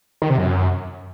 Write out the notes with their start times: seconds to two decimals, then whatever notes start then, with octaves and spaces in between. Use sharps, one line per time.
0.22 D#3
0.30 C3
0.38 F#2